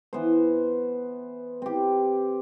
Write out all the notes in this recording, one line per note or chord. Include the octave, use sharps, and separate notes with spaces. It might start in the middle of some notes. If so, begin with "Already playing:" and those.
E3 B3 C5
C4 G4